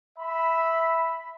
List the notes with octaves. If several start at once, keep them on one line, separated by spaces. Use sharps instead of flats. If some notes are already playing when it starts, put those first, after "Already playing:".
E5 B5